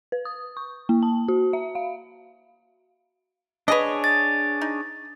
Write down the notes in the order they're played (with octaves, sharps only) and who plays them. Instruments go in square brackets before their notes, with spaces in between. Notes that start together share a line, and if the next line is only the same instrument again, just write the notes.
[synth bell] B4
D#6
C#6
A#3
A5
F#4
E5
F5
[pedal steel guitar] D4 G#4 C#5 [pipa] B4 D#5
[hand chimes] A6
[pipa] D#4